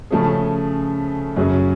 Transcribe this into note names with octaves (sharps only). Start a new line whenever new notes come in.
C#3 F3 A3 C#4 G#4
F#2 C#3 F#3 C#4 G#4